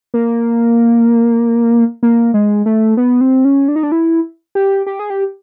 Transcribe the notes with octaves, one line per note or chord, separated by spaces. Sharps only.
A#3
A#3
G#3
A3
B3
C4
C#4
D4
D#4
D4
E4
G4
G4
G#4
G4